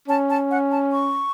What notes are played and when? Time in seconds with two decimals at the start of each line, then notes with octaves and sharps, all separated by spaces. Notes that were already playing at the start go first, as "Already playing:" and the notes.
0.08 C#4 A5
0.30 A5
0.51 F#5
0.71 A5
0.92 C#6